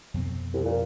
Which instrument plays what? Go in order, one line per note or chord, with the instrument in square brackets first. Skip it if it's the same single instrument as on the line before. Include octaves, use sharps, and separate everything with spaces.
[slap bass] F2 B2 C4
[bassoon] C2
A#2